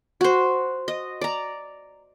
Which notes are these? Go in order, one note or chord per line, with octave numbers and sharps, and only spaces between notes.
F#4 C5
D#5
D5 A#5